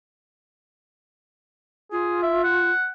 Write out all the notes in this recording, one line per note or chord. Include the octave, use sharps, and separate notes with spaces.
F4 G#4
E5
F#5